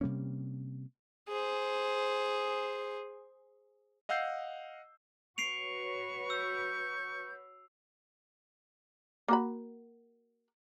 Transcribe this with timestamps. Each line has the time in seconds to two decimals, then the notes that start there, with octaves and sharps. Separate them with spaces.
0.01 C3 G3 A#3 C#4
1.29 G#4 C5
4.09 D#5 F5 F#5 E6 G6 C7
5.38 F#4 B4 C#5 C#6 C7 D7 F7
6.30 E6 G6
9.28 A#3 F#4 B5